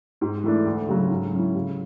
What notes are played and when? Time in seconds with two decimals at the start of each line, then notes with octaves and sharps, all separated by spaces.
0.21 G#2
0.44 E3 A3 D4
0.66 D2
0.89 C#3 F#3
1.10 G#2
1.33 F#3 C#4 E4
1.55 C#3